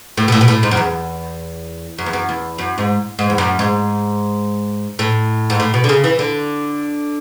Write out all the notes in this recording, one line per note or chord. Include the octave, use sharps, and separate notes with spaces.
A2
B2
A2
B2
A2
G#2
F#2
E2
F#2
E2
F#2
E2
F#2
G#2
G#2
E2
F#2
G#2
A2
G#2
A2
B2
D3
C#3
E3
D3